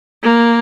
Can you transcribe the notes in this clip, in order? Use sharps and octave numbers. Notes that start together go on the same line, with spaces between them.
A#3